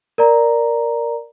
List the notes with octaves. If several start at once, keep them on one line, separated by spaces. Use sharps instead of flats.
A#4 D5 A#5